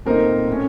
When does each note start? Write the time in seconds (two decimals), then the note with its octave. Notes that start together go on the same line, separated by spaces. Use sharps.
0.06 A#2 A3 C4 D#4 A#4
0.48 A2 A3 C#4